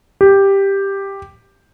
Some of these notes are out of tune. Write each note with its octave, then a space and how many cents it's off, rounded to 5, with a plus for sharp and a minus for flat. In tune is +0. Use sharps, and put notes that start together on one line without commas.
G4 +5